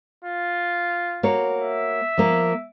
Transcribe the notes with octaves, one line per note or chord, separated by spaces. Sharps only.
F4
A#3 F#4 C#5
E5
F3 A#3